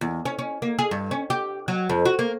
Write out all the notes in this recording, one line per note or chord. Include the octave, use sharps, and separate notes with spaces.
E2
C#4
C#4
A#3
G#4
G2
C#4
G4
F#3
F2
F#4
A#3